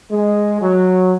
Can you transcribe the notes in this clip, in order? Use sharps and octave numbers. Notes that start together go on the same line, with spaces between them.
G#3
F#3